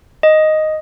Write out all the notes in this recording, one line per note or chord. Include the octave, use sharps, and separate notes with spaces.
D#5